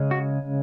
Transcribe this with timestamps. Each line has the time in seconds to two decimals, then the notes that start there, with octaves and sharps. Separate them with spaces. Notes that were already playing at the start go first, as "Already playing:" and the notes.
Already playing: C#3 G#3 C#4
0.11 F#4